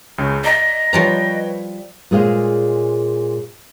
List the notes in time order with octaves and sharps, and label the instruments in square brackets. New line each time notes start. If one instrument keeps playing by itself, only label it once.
[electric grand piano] C#2 C#3
[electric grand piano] D5 A#5 B6 [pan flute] D#5
[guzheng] F3 G3 A#5 [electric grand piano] B4 C#5 G5
[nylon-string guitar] A#2 G#3 G#4 C5 C#5 F5